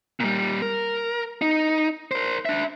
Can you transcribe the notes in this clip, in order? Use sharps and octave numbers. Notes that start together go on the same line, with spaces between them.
A#2 G3
A#4
D#4
A#4 C5
D4 E5